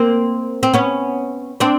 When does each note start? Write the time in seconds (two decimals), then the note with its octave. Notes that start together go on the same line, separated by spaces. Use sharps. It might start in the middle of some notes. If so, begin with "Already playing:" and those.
Already playing: A#3 C4
0.63 C4
0.74 B3 C#4
1.60 C4 D4